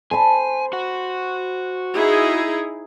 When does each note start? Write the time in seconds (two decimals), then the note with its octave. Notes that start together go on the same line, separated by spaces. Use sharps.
0.11 C5 G#5 A5 B5
0.73 F#4 F#5
1.95 D#4 E4 G#4